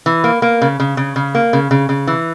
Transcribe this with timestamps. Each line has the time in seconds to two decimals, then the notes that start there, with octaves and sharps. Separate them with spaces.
0.06 E3
0.24 A#3
0.42 A#3
0.62 C#3
0.80 C#3
0.97 C#3
1.16 C#3
1.35 A#3
1.53 C#3
1.71 C#3
1.89 C#3
2.07 E3